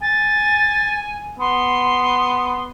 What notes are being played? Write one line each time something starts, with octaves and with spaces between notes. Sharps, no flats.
G#5 A6
B3 C6